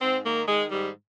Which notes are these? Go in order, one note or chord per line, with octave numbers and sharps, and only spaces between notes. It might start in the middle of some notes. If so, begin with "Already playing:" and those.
G#2 C4
D#3 A#3
D#3 G#3
G#2 G3